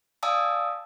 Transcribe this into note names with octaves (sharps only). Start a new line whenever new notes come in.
D5 F5 G#5 A5 D#6 E6